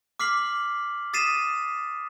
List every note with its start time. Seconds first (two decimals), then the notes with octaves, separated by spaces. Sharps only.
0.20 D6 F6 B6 C7 F#7
1.13 D#6 A6 B6 C7 D#7 E7